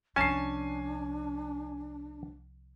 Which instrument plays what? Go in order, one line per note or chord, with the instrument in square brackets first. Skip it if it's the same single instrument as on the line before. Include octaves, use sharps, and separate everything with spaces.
[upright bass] C2 F3 [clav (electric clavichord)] C#4 A5 [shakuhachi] D4 [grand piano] G#5 C7